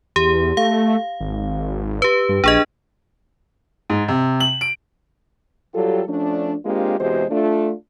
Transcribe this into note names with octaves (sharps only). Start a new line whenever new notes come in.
E2 G4
A3 F5
G#1
G4 B4
G2
A#1 D4 G#4 D#5
G#2
C3
F#7
D7
F#3 G3 F4 G4 A4
F3 A3 C#4 D4
G#3 A#3 C4 D4 F4 G4
E2 C3 G#3 F#4 G4 C5
A3 D4 F4